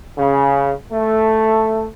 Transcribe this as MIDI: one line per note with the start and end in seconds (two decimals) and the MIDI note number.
0.17 0.73 49
0.91 1.85 57